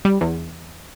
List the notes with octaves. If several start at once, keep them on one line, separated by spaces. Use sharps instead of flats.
G3
E2